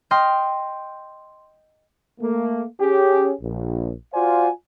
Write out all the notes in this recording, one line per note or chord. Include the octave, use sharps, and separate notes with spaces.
D#5 G5 C6 F6
A3 A#3
C#4 G4 G#4
A#1
F4 F#4 C5 D5 F5 G#5